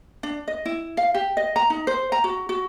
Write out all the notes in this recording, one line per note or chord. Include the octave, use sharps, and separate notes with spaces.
D4
D#5
E4
F5
G4
D#5
A#5
D#4
C5
A#5
F#4
F#4